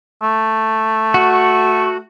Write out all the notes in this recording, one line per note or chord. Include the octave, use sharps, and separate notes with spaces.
A3
F#4